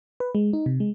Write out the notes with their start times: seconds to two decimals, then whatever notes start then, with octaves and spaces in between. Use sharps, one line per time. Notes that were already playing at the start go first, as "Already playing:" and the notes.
0.20 B4
0.35 G#3
0.53 D#4
0.66 C3
0.80 G#3